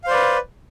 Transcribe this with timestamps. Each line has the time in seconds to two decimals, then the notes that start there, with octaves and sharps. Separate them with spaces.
0.04 F5
0.07 C5
0.10 D5
0.13 B4